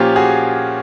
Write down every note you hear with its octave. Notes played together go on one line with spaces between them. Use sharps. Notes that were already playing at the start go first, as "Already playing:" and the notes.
Already playing: A#2 F3 A#3 C#4 F4 G4
F#4 G#4